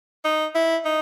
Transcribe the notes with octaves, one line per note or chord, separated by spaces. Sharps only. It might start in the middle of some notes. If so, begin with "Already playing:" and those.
D#4
E4
D#4